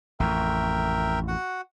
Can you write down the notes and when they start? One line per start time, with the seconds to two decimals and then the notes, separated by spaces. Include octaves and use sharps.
0.20 A1 F2 A#4 E5 G5
1.28 F#4 F#5